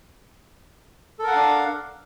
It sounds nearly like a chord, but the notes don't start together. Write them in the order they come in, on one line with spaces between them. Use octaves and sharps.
A4 A#4 F#5 F5 D4